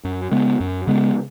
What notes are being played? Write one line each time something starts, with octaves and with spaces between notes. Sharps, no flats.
F#2
C#3 G#3 B3
F#2
C#3 G#3 B3